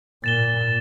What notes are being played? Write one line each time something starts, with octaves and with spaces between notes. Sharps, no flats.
A#2 A6 E7 G7